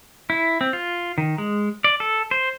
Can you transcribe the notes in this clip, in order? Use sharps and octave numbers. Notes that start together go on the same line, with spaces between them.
E4
C4
F4
D#3
G#3
D5
A4
C5